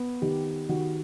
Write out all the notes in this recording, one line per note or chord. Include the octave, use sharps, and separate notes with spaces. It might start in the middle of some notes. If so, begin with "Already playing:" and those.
Already playing: B3
D#3 G4
D#3 F#4